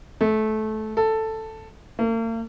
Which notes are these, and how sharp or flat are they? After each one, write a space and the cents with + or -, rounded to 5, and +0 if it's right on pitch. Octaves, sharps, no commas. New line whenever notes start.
A3 -20
A4 +5
A#3 -45